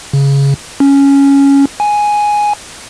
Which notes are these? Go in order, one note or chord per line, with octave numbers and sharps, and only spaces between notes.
C#3
C#4
G#5